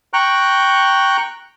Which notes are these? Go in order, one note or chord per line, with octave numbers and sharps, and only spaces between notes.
G5 A#5 C#6 F#6